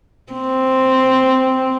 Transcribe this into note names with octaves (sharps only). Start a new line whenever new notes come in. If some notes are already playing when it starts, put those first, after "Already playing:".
C4